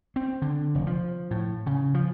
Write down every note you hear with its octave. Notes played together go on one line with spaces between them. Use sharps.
C4
D3
F1
F3
A2
C#3
F3